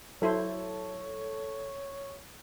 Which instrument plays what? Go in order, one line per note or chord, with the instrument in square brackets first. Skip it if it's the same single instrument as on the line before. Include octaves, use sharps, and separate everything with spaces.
[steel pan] F#3 E4 C5 [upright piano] A4 [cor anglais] C#5